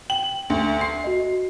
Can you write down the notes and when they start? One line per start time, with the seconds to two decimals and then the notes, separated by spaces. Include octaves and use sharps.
0.10 G5 F#7
0.50 D2
0.81 C6 C7
1.04 F#4 D#5